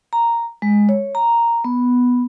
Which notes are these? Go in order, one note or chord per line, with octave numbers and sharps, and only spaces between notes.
A#5
G#3
C#5
A#5
B3